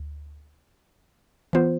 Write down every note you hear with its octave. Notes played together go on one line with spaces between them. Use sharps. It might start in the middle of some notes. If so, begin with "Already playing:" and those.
Already playing: D2
E3 B3 F4 C5